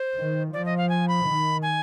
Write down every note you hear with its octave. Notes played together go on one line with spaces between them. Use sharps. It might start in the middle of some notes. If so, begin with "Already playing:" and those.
Already playing: C5
D#3
F3 D5
D#5
F5
G#5
B5
D#3
G#5